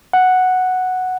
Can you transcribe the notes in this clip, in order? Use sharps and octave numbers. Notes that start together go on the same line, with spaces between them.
F#5